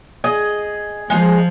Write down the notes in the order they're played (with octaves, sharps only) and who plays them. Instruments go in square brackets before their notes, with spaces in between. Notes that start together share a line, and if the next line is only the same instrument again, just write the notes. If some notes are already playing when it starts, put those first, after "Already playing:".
[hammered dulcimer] G#4 [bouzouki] D#5
[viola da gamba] F3 [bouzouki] G#3 D#4